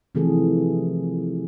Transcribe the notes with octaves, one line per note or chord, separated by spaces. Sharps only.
C3 E3 F3 A3 G#4 A4